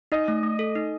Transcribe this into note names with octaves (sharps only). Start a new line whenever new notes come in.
D#4 D#5
A3
A3
A4
D#4